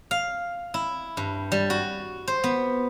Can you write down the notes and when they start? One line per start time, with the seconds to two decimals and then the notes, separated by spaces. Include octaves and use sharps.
0.11 F5
0.74 E4
1.17 G2
1.52 G3
1.70 F#4
2.28 C5
2.44 B3